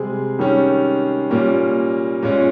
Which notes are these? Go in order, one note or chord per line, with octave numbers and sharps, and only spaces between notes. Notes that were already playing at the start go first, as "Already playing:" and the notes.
Already playing: C3 G3 G#3 C4 G#4
D#3 G3 C#4
A#2 G3 A#3 C#4
A#2 G#3 C#4